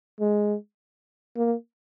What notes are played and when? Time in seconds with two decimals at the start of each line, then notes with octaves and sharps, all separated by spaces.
0.20 G#3
1.37 A#3